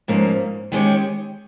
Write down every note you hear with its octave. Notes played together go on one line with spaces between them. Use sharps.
G#2 F3 A#3 C#4
D#3 G#3 C#4 G4 C#5